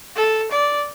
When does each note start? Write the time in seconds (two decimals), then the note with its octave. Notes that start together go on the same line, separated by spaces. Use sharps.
0.16 A4
0.51 D5